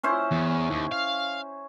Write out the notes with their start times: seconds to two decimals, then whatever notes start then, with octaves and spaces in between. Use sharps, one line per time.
0.03 C#4 E4 C5
0.31 E2
0.70 D#2
0.92 F5